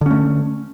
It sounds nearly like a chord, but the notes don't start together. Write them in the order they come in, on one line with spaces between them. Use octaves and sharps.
D3 C#4 A3